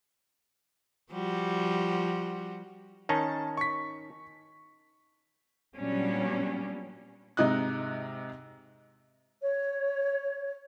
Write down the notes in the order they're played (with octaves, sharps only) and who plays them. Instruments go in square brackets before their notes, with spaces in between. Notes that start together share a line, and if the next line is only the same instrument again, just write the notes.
[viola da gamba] F3 G3 F#4
[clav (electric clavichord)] D#3 C#4 D#4 [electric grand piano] A5
[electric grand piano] C#6 B6
[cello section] A#2 F#3 G3 B3 C#4 D4
[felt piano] G#2 C3 D#4 D#5 F#6
[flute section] C#5